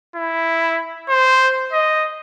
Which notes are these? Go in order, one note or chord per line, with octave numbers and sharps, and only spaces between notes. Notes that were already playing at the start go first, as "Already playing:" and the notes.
E4
C5
D#5